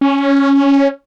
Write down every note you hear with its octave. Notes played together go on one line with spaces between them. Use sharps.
C#4